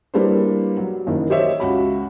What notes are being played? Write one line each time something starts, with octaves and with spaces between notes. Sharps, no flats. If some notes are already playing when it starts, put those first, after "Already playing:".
G3 A#3 D4 E4 B4 C5
F#3
F#1 D#3 E3
G4 C5 C#5 D#5 E5
C#2 F#4 B5